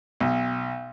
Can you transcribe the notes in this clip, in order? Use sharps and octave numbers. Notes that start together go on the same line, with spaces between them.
B1